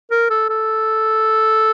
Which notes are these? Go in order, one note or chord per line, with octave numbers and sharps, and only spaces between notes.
A#4
A4
A4